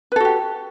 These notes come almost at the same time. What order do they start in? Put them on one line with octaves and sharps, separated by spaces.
B4 A4 F#4 G4